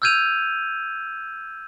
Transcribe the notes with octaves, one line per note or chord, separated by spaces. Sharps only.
E6 F6 G6 G#6 D#7 F7